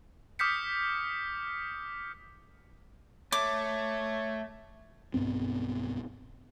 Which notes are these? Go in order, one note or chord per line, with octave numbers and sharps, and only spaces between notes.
D6 D#6 F6 G6 B6 C#7
A3 C#5 D6
B1 G2 B3 C4